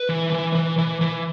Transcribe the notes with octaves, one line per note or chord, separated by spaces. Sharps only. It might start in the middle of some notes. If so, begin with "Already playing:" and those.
Already playing: B4
E3
E3
E3
E3
E3